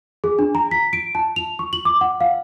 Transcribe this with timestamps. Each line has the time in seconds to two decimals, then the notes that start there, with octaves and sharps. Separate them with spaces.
0.24 G#4
0.39 D4
0.55 A#5
0.71 B6
0.93 D7
1.15 A5
1.36 F7
1.59 C#6
1.73 F#7
1.85 D6
2.01 F#5
2.21 F5